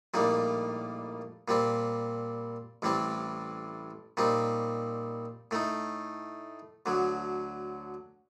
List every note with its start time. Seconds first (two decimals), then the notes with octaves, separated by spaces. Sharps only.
0.14 A#1 A2 G3 A#3 D#4
1.48 A#2 G3 C4
2.82 A1 A2 G3 C4
4.17 A#2 G3 C4 D#4
5.51 A2 A3 D#4
6.86 D2 D3 F#3